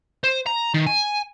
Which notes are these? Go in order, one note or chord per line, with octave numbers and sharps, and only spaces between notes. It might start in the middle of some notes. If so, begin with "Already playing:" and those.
C5
A#5
D#3
G#5